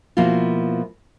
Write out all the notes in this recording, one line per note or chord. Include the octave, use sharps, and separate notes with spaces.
B2 F3 A#3 E4 F4